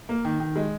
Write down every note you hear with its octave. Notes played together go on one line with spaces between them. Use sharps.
A#3
D#3
D#3
G#3